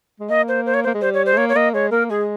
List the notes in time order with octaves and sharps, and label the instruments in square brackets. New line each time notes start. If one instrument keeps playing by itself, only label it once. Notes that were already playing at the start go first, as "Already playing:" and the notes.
[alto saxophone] G#3
[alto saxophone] A#3 [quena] D#5
[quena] C5
C5
C#5
C5
[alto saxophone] A#3
G#3
[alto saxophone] G3 [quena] C5
[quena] C#5
C5
[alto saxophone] G#3
[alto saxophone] A#3 [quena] C#5
[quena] C#5
[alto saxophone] A#3 [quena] D#5
[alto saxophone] G#3 [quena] C#5
[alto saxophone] A#3 [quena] A#4
[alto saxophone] G#3 [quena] G#4